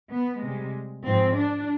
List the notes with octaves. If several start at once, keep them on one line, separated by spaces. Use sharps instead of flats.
B3
C3 G3 G#3
G#2 F3 G#3 C4
D4